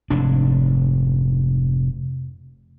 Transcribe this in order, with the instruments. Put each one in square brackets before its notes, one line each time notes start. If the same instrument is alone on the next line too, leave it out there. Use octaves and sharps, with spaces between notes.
[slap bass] F1 G#2 D4